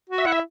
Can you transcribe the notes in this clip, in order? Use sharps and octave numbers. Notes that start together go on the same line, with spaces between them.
F#4
E5
E4 F#5
E5